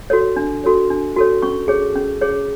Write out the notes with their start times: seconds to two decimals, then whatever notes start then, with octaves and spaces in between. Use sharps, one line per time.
0.10 F#4 A4 C#5
0.36 D4
0.64 F#4 A4 C#5
0.90 D4
1.16 F#4 A4 C#5
1.42 C#4 C#6
1.68 G#4 C#5
1.95 C#4
2.21 G#4 C#5